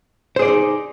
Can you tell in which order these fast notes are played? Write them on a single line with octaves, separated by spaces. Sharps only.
C5 G#4 D5 C#4 D#4